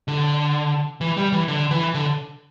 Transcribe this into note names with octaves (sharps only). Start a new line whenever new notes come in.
D3
E3
G3
E3
D3
E3
D3